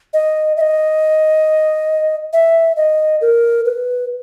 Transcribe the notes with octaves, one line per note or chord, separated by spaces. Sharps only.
D#5
E5
D#5
E5
D#5
A#4
B4